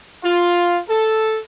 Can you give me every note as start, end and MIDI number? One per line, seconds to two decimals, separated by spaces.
0.23 0.78 65
0.88 1.37 69